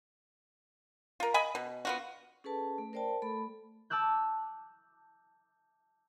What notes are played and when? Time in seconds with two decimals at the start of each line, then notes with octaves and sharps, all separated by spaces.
1.20 F4 A#4
1.34 D#5 G#5 B5
1.55 B2
1.85 B3 F4 F#4
2.44 C#4 G#4 A4 B4 A5
2.78 A3
2.93 A#4 C5 D5 G5 A5
3.22 A3 A4 B5
3.90 A5 D6 E6 F#6 G6